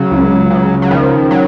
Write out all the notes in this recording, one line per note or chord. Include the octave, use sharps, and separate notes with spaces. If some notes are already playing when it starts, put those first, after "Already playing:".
Already playing: C#3 F#3
C#2
C#3
F#3
D#3 F3
F#3